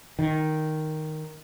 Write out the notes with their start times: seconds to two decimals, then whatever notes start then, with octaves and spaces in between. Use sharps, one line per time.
0.19 D#3